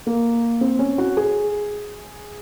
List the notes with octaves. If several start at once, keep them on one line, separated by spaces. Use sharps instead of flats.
A#3
C4
C#4
F#4
G#4